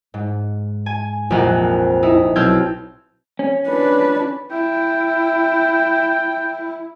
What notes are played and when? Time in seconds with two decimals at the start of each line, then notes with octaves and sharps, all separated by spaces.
0.14 G#2
0.86 G#5
1.30 A#1 F2 C3 A#3 A#4 F#5
2.03 D#4 E4
2.36 B1 C4 F5 E6 G6 G#6
3.39 C#4
3.68 D4 B4
4.51 E4 G5